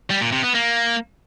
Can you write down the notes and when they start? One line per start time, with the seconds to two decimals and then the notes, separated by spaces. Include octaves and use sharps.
0.10 G3
0.21 A#2
0.32 C3
0.43 B3
0.54 A#3